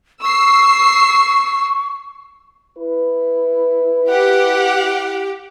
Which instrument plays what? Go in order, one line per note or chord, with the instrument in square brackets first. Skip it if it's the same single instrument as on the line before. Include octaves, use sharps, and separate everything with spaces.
[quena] C#6 [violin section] E6 C7
[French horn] E4 [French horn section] B4
[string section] G4 [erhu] F#5